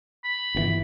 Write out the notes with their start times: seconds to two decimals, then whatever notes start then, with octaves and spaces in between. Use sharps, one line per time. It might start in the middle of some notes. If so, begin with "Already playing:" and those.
0.24 B5
0.54 G1 B2 E3